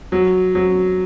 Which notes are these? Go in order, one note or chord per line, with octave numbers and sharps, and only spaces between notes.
F#3
F#3